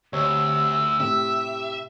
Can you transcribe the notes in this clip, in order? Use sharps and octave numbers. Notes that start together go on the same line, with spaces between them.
D2 C3 C#5 D#5 E6
A2 C3 G4 E5